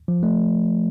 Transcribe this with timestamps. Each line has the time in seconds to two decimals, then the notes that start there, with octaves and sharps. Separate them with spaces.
0.08 F3
0.23 A3